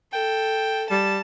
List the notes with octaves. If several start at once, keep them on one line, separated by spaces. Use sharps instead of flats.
A4 G5
G3 A5